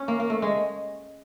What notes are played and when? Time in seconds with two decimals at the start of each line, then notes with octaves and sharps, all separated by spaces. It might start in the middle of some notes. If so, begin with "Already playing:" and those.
Already playing: C#4
0.08 A#3
0.20 A#3
0.30 A3
0.42 G#3